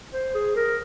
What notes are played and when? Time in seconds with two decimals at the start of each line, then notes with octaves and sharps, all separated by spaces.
0.13 C5
0.34 G#4
0.56 A#4